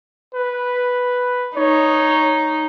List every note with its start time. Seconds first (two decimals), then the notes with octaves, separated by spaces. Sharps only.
0.34 B4
1.56 D#4 C#5